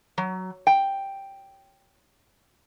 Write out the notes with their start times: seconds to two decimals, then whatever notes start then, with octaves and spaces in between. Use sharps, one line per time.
0.18 F#3
0.67 G5